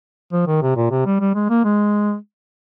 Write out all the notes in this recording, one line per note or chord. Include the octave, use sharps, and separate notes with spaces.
F3
D#3
C3
A#2
C3
G3
G3
G#3
A#3
G#3